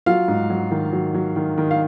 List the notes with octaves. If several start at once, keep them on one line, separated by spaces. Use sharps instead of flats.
F#3 F4 F5
G#2
F#3
D#3
F#3
F#3
D#3
D#3
F5